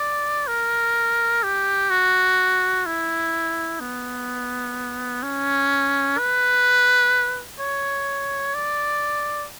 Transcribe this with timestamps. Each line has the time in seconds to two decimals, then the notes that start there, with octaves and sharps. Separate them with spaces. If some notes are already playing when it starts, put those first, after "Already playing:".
Already playing: D5
0.48 A#4
1.43 G4
1.90 F#4
2.86 E4
3.80 B3
5.23 C#4
6.18 B4
7.60 C#5
8.54 D5